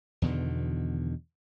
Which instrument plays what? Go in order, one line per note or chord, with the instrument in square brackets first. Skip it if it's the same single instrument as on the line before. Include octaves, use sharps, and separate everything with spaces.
[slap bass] E2 B2 D3 D#3